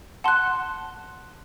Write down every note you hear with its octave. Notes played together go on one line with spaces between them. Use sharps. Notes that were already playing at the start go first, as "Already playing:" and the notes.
F#5 A5 C6 F#6